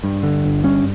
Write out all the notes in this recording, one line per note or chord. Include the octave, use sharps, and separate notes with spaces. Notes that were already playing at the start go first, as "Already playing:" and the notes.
G2
D3
G1
G2 C#4